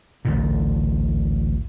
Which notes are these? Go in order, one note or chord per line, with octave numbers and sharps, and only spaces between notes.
A1 D2 G2 A#2